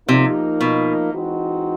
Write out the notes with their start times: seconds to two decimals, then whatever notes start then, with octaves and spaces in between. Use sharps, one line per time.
0.08 C3 F3 A#3 D#4
0.61 B2
1.13 E3 G#3 C4 D#4 F#4